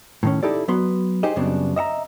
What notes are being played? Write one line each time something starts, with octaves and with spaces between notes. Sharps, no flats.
A2 D#3 C#4
D#4 E4 G4 A4 D5
F#3 B3 B4 C6
D#4 G4 G#4 C5 D#5
F#2 C#3 G3 B3 C4 D4
D#5 E5 F#5 A#5